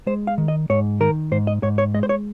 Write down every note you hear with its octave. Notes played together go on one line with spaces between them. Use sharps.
G#3 C5
F5
D#3
D#5
G#2 C#5
D#3 A#4
G#2 C5
D#5
G#2 C#5
C#5
G#3 D#5
C5
C#5